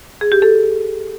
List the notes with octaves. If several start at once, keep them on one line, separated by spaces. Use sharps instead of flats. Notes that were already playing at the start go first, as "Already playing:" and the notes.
G#4
G4
A4